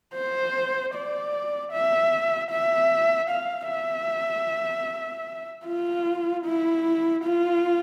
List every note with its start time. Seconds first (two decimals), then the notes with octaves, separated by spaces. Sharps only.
0.15 C5
0.94 D5
1.72 E5
2.51 E5
3.30 F5
3.70 E5
5.66 F4
6.45 E4
7.24 F4